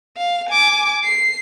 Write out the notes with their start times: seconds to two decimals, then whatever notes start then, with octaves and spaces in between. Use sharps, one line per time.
0.17 F5
0.49 G#5 D6
1.04 C7